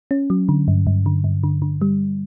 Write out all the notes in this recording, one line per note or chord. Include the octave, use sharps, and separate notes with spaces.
C#4
F#3
D3
G2
G2
D3
G2
D3
D3
G3